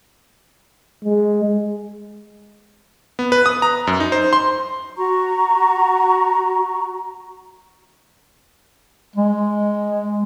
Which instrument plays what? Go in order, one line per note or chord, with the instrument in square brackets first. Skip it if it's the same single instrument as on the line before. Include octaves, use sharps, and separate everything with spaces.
[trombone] G#3
[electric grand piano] B3
B4
D#6
A#5
F#2
D#4
C5
C6
[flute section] F#4 A#5 C#6
[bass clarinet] G#3